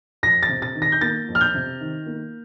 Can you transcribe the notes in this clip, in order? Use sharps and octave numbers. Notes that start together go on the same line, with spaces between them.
F2 A#6
A6
C3
A6
D#3
A#6
G6
A#3 A6
F2
F6
G6
C3
D#3
A#3